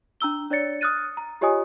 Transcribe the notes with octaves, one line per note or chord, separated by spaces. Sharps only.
D4 A#5 E6 G7
D4 C#5 D5 A6 C#7
D#6 F6 F#6 A6 D#7
A#5
F4 G4 C#5 D#5 G#5 D#6